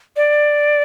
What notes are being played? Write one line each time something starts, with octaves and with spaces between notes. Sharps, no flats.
D5